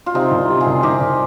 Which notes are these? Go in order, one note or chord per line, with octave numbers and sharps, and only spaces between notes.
F4
C3 C4 D#4
C2
C3
F4 G#4
C2
C2 D#4 G4
C2